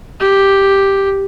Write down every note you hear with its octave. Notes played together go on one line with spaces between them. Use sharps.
G4